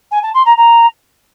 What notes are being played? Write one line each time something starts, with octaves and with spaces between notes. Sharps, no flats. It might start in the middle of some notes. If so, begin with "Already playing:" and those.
G#5
A5
C6
A#5
A#5